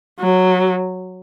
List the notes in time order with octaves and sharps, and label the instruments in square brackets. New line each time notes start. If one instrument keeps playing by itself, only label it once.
[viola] F#3